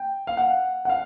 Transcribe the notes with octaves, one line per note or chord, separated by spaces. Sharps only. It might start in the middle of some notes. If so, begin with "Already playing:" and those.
Already playing: G5
F5
F#5
F#5
F5